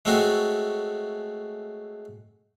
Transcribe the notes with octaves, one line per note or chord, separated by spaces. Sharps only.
G#3 A3 C4 C#4 F#4